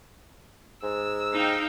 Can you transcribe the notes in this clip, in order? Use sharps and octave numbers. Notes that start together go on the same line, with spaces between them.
G#2 E6
D#4 F5 G5